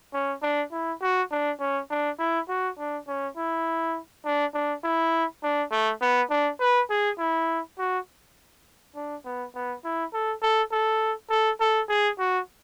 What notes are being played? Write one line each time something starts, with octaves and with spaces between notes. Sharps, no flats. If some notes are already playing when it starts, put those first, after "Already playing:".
C#4
D4
E4
F#4
D4
C#4
D4
E4
F#4
D4
C#4
E4
D4
D4
E4
D4
A3
B3
D4
B4
G#4
E4
F#4
D4
B3
B3
E4
A4
A4
A4
A4
A4
G#4
F#4